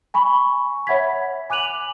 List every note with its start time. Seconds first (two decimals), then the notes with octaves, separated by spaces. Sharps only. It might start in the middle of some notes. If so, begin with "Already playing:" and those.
0.14 G#5 B5 C#6
0.87 C#5 E5 F#5 B5 G#6 B6
1.50 G#5 D6 F#6 D#7 F7 F#7